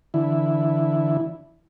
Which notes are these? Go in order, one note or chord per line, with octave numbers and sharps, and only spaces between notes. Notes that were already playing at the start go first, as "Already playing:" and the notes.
D3 E3 E4